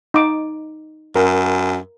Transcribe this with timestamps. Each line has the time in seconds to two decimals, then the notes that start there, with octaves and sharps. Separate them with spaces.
0.14 D#4 D6
1.16 F#2 A#4